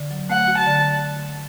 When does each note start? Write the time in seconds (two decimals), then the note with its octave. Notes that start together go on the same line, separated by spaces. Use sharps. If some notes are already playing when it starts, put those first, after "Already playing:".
Already playing: D3
0.11 F#3
0.30 A3 F#5
0.48 F#4
0.57 A5
0.67 D3